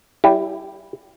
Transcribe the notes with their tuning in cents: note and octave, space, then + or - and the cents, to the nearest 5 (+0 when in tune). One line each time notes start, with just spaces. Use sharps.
G3 -40 E4 +0 G4 +0